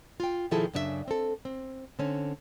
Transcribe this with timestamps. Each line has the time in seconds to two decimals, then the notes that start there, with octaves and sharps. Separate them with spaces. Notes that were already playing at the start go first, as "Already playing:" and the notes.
0.20 F4 G5
0.51 B2 D#3 F3 E4 G#4 A4
0.73 F#2 C#3 D4 G4 E5
1.08 C4 A4
1.45 C4
1.99 D3 C4 C#4